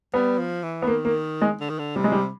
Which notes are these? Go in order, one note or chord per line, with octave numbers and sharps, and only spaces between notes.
G3 B3
F3
E3
B3
D#3 A#3
A#3
G#3
D3
D#3
D3
C3 G3
G#3
G3